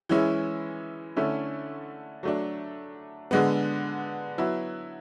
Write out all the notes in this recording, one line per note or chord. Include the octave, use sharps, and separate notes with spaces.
E3 G#3 C#4 E4
D3 A3 C#4 E4
F#3 A3 D4
D3 G#3 B3
F#3 B3 E4